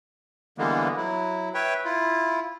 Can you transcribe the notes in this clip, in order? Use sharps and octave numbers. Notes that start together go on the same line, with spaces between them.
D3 E3 G3 G#3 A#3 B3
F#3 E4
B4 C#5 E5 G5
E4 F4